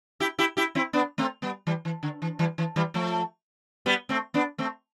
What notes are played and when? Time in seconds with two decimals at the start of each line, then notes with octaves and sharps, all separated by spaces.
0.20 E4 G4
0.39 E4 G4
0.57 E4 G4
0.75 C4 E4
0.93 B3 D4
1.18 A3 C4
1.42 G3 B3
1.67 E3 G3
1.85 E3
2.03 D3
2.22 E3
2.39 E3 G3
2.58 E3
2.76 E3 G3
2.94 F3 A3
3.86 G3 B3
4.09 A3 C4
4.34 B3 D4
4.58 A3 C4